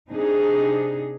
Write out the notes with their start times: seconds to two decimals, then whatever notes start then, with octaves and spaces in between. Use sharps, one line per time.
0.11 C3 D4 D#4 G#4